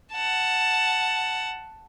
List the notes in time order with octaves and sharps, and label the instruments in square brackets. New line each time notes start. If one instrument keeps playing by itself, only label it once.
[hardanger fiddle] F#5 A5